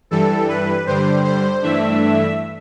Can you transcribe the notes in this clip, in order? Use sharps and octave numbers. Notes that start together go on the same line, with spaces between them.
G2 E3 G3 A4
B4
G2 D3 G3 C5
C5
G2 E3 A3 D4 E5